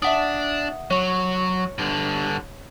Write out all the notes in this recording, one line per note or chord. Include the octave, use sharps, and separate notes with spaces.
D4 E5 F#5 D#6
F#3 C#5 C#6
G2 D3